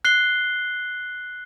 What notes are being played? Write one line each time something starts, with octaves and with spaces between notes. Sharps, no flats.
F#6 C7 G7